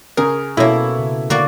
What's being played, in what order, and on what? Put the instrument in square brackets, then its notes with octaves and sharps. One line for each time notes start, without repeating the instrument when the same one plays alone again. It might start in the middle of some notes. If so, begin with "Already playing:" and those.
[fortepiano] C#3 A#4 [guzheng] G#4
[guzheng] B2 A#3 [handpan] C#4 F#4 A4 [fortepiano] E4 C#5
[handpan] C#3
[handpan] D3 [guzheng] A#3 F#4 D5